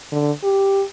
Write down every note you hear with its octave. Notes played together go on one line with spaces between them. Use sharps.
D3
G4